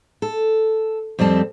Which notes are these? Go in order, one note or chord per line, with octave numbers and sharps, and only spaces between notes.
A4
F2 G3 C4 A5